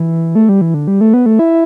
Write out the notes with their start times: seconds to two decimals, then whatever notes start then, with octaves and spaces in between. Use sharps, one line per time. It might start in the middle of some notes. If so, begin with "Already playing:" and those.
Already playing: E3
0.35 A3
0.49 G3
0.61 E3
0.74 D3
0.87 G3
1.01 A3
1.14 B3
1.26 A3
1.39 E4